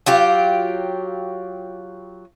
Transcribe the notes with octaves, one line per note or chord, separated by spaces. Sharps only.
F#3 F4 G4